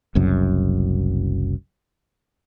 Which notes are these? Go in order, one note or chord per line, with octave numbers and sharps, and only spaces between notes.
F#1 C2 F#2